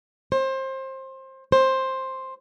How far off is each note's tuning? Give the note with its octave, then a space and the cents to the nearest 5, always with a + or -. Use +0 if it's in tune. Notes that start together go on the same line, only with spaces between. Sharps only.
C5 +25
C5 +10